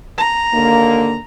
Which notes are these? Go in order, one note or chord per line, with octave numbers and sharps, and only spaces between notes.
A#5
D#2 D3 A#3